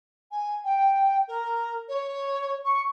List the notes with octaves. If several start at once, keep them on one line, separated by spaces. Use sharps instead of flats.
G#5
G5
A#4
C#5
C#6